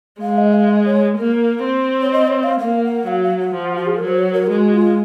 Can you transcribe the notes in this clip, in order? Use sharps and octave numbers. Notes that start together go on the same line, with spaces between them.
G#3 F5
D#5
F5
D#5
C#5
A#3
C4
C#5
D#5
C#5
F5
A#3 F5
F#5
F#3 F5
F5
F#5
F3
F#4
G#4
A#4
F#3
C5
C#5
A#4
G#3 F#4
F4